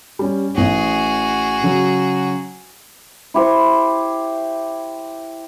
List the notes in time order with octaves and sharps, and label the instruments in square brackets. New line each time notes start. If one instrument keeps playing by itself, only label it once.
[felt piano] G3 C#4
[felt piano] A1 C#4 [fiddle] F#4 G#4
[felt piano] C#3 F#3
[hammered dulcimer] E4 G4 C5 C#6